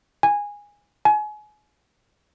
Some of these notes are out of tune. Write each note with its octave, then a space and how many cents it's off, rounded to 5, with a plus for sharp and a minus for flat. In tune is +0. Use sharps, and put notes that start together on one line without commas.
G#5 -15
G#5 +30